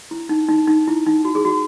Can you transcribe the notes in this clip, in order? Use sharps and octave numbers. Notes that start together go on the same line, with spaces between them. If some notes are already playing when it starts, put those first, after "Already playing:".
E4
D#4
D#4
D#4
E4
D#4
F#4
G#4
F#4